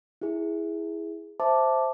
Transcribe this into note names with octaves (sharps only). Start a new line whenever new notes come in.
E4 G#4
C5 E5 A5 D6